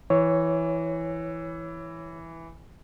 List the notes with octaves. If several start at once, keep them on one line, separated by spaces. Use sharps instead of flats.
E3 C#5